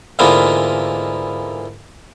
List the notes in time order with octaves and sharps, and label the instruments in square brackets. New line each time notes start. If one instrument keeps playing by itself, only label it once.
[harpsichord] G#2 D3 E3 A#3 B3 F4